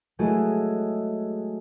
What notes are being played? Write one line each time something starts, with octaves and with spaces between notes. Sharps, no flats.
F#3 G#3 A3 E4 F#4 G#4